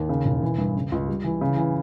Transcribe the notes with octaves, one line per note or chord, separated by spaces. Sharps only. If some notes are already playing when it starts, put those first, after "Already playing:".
Already playing: D#2
C#3
E1
E3
G2
C#3
C#2
G3
E3
C#3
E3